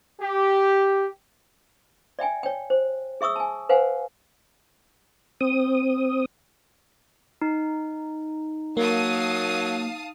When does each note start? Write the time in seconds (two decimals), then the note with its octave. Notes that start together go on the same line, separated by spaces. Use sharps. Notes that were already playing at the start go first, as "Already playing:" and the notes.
0.21 G4
2.19 D5 E5 G5 G#5
2.43 C#5 G5
2.70 C5
3.21 G#4 E5 C#6 D#6 E6
3.36 G#5 A5
3.69 B4 C5 F5 F#5 G#5
5.41 C4 D#6
7.42 D#4
8.77 F#3 A#3 F5 A5 D#6